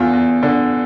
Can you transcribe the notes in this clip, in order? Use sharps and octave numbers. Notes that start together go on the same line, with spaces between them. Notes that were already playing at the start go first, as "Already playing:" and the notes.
Already playing: E2 D3 F4
E2
D3